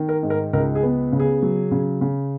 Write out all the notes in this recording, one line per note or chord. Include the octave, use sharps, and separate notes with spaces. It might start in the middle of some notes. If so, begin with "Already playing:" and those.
Already playing: D#3
A#4
G#2
A#4
C#2 A#4
G#4
B3
C#3
G#4
F#3
C#3
C#3